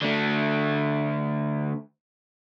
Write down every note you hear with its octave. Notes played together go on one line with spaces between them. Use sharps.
D3 A3